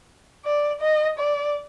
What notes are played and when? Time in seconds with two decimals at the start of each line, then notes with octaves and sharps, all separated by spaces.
0.45 D5
0.81 D#5
1.19 D5